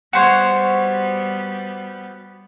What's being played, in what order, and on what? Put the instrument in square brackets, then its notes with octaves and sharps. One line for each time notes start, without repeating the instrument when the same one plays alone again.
[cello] G3 B3 [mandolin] F#4 C5 C#5